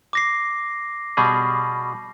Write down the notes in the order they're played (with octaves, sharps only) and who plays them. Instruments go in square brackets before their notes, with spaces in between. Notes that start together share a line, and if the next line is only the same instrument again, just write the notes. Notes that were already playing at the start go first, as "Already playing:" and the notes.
[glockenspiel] D6 A#6 C7
[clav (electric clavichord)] B2 G3 G#4